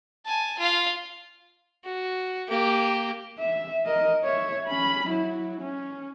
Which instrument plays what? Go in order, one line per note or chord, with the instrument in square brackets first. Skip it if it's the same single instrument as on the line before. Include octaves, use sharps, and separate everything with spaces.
[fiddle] G#5 A5
F4 F5
F#4
A#3 G4
[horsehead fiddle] E5
A#4 D#5
C#5 E5
C#4 B5
F#3 E4
C#4